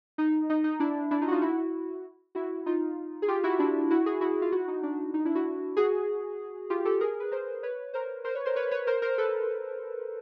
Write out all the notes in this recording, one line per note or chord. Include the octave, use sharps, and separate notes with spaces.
D#4
D#4
D#4
D4 E4
D4 E4
D#4 F4
F#4
D#4 F4
E4 F#4
E4 F#4
D#4 F4
G#4
F4 G4
E4 F#4
D4 E4
E4 F#4
F#4 G#4
E4 F#4
F4
E4 F#4
D#4
D4
D#4
D4 E4
E4 F#4
F#4 G#4
F4 G4
G4 A4
G#4 A#4
B4
A#4 C5
B4 C#5
A#4 C5
A#4 C5
B4 C#5
A#4 C5
B4 C#5
B4 C#5
A#4 C5
A#4 C5
A4 B4